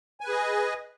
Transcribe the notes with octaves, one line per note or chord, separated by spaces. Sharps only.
G#4 B4 D#5 G#5